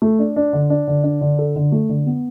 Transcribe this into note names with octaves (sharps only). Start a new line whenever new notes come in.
A3
D4
D4
D3
D4
D3
D4
D3
A4
D3
A3
D3
B3